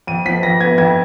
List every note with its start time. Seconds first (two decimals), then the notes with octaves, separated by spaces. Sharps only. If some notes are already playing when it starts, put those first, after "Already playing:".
0.07 F2 D#7
0.25 F3 B6
0.43 F2 A#6
0.61 B3 G#6
0.78 F2 G#6